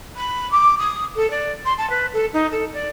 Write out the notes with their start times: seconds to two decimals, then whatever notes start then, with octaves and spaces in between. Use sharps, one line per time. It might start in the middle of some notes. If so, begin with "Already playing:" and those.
0.16 B5
0.51 D6
0.78 D#6
1.16 A4
1.30 D5
1.65 C6
1.78 A5
1.90 B4
2.13 A4
2.33 D#4
2.51 A4
2.73 D5